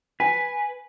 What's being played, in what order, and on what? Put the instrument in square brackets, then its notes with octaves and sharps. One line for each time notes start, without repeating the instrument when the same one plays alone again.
[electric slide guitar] B4 [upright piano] G#5